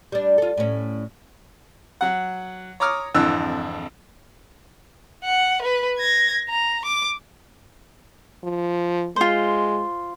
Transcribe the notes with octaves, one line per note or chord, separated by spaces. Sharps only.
G3 D4
F4 A4
A2 C#4
F#3 F#5
C#5 A#5 D6 D#6 F6
G#1 F2 D3 E3 E6 F#6
F#5
B4
G#6 A#6
A#5
D6
F3
G#3 F4 C5